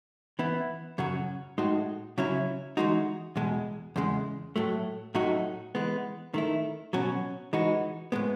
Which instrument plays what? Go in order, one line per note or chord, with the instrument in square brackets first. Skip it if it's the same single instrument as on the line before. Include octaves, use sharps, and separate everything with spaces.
[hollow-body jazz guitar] E3 B3 E4
F#2 C#3 F#3 C#4 F#4
A2 G#3 D#4 F#4
C#3 F#3 C#4 E4
E3 G#3 D#4 F#4
E2 B2 G#3
E2 C#3 G#3
A2 F#3 A3
A2 F#3 A3 D#4 F#4
E3 G#3 B3
D#3 A3 E4
B2 F#3 C#4 F#4
E3 G#3 D#4 F#4
A2 G#3 B3